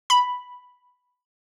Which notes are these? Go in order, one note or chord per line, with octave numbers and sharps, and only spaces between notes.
B5